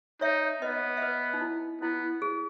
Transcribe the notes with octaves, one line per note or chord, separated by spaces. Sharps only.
D#4 C#5 E5
B3 B4 D#5
E5
B4 D#5
D#4
E4
B3 E4
G#4